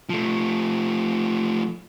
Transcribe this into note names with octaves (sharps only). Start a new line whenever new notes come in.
F3 A3